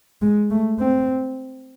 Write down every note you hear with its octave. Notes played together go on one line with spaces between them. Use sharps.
G#3
A3
C4